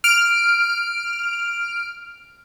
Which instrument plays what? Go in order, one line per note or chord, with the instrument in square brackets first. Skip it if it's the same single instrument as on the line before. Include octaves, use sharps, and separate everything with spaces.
[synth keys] F6 D7